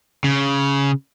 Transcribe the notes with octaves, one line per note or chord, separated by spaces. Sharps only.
C#3